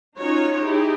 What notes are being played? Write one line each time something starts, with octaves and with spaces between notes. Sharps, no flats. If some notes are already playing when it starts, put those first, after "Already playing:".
C#4 D#4 F4 F#4 C#5
D#4 E4 G4 G#4